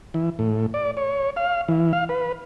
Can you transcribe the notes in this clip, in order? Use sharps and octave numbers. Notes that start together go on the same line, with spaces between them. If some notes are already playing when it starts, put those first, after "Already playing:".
E3
A2
D5
C#5
F5
E3
F5
B4